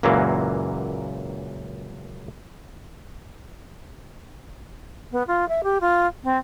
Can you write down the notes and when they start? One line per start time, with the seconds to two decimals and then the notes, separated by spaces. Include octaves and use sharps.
0.03 C#2 F#2 A#2 E3 F#3 A#3
5.12 B3
5.27 F4
5.49 E5
5.64 G4
5.81 F4
6.24 C4